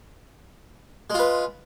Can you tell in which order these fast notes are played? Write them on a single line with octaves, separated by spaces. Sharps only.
G#3 F4 B4